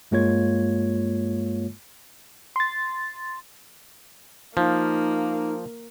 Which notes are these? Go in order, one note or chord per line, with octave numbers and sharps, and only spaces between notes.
G2 G#3 A#3 F4 C#5 G#6
C6 A6
F3 A#3 D#4